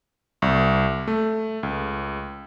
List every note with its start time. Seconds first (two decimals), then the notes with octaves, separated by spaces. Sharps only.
0.42 C2
1.08 A3
1.63 C#2